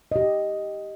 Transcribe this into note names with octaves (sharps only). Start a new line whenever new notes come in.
G4 D#5